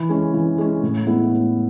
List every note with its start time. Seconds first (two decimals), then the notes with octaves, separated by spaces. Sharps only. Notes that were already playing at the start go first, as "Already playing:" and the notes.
Already playing: E3
0.09 G#3 C#4
0.34 E3
0.58 G#3 C#4
0.83 A2
1.07 G#3 B3 E4
1.31 A2